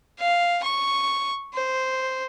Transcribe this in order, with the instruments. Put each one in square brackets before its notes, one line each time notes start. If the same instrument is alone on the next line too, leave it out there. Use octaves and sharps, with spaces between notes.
[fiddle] F5
C#6
C5